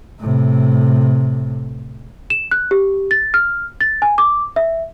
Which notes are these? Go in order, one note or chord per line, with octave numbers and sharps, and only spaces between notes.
A2 C3
E7
F#6
G4
A6
F6
A6
G#5
D6
E5